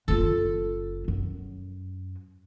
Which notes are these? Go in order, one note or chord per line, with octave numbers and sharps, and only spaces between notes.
F#1 F4 A4
F#2